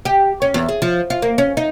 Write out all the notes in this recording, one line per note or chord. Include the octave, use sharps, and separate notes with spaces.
G4
C#4
E2
G#4
F3
F4
A#3
C#4
D#4